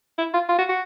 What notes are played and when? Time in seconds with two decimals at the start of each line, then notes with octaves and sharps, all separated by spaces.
0.18 E4
0.34 F4
0.49 F4
0.58 F#4
0.69 F#4